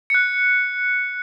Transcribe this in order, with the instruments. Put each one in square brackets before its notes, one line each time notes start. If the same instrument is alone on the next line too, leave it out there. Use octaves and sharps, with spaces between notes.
[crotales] F#6 C#7